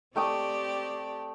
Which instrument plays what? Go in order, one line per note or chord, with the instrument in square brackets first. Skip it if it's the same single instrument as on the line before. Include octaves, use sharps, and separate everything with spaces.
[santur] A3 G5 D#6 [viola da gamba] C4 G4 D5